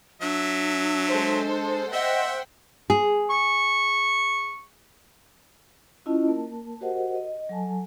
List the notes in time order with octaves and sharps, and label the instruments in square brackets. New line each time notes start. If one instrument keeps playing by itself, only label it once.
[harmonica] F#3 E5 [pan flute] D4
[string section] G#3 A4 C5
[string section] C5 F#5 G5 [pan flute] D#5 [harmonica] E5
[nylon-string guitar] G#4
[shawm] C#6
[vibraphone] C#4 E4 F4 D#5 A5
A#3 A#4 A5
F#4 G4 A#4 C5 D#5 F#5
D#5
F#3 A4 G#5 A5